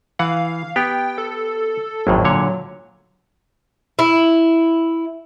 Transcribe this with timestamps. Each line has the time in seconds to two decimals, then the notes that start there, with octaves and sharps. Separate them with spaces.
0.19 E3 F5 F#5
0.76 B3 G4 G5
1.18 A4
2.07 G#1 F2 A2 F#3
2.25 A#2 D3 C#5
3.99 E4